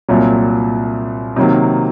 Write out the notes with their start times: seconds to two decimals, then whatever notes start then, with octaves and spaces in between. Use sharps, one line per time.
0.08 C2 A#2 F#3
1.36 C3 D#3 F#3 A#3